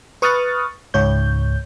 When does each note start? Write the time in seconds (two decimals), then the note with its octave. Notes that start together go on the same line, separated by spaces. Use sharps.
0.22 B4 C#6 D#6 F6 F#6 A6
0.94 C#2 G#2 C#5 G6